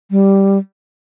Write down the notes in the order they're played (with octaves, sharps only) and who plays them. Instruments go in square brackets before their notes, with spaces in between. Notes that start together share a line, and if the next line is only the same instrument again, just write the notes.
[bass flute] G3